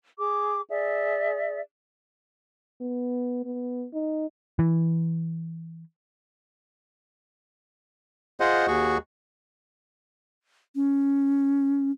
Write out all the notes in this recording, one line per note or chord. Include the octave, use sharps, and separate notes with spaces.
G#4 D6
G#4 D5 E5
B3
B3
D#4
E3
F4 G#4 C5 D#5 F#5
D#2 F#4 G#4 C#6
C#4